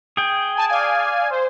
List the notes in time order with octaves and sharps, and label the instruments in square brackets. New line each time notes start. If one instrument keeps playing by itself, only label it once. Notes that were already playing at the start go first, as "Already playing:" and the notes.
[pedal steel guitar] G#4 G5
[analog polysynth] G#5 A5
D5 F5 G#5
C5